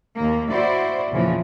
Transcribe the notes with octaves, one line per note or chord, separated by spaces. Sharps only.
D#2 A#3
E4 F#4 C5 D5
E2 A#2 C#3 E3 F3